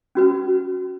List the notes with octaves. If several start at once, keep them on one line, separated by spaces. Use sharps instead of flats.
C#4 F#4 B4